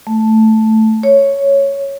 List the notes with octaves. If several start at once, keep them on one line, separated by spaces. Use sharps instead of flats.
A3
C#5